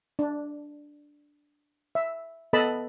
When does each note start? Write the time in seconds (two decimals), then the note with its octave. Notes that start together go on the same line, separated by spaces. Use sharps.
0.19 D4
1.95 E5
2.53 B3 A4 B4 D#5 A5 B5